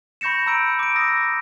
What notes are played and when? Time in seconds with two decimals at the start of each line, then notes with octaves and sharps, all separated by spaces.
0.21 B5 C#6 G6 A#6 C#7 E7
0.46 A#5 B5 E6 G6 D7
0.79 D6 D7
0.96 D#6 E6 A#6
1.12 A#6